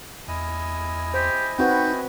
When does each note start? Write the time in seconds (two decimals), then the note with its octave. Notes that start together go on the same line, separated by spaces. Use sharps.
0.28 E2 E4 D#5 G#5
1.14 G4 C5
1.59 C4 D#4 F#4 B4 G5